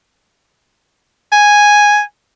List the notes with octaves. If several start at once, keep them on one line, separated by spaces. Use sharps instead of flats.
G#5